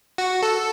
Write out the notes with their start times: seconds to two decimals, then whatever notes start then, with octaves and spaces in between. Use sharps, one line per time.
0.18 F#4
0.42 A4